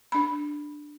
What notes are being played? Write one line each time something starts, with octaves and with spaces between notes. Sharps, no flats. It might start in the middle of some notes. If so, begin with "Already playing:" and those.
D4 B5